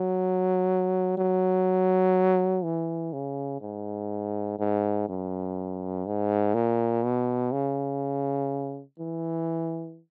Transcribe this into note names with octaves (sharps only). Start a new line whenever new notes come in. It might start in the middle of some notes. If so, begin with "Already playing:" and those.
Already playing: F#3
F#3
E3
C#3
G#2
G#2
F#2
G#2
A#2
B2
C#3
E3